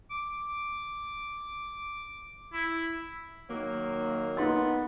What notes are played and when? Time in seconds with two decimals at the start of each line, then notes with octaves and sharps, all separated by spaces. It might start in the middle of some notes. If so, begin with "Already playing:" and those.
0.11 D6
2.53 E4
3.50 D#3 F#3 A#3
4.37 B3 D#4 C6 A6